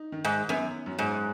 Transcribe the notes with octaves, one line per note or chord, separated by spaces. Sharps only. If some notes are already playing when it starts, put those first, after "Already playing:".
Already playing: D#4
D#3
G#2
F#2 B3
F#2
G#2